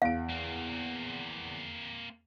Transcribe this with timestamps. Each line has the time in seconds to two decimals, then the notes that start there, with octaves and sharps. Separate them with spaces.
0.02 E2 F5 D7
0.29 A#3 C4